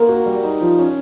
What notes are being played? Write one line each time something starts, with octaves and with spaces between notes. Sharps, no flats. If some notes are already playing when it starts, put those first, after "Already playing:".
Already playing: A#3 A#4
F#4
G3
D#4
F3
C#4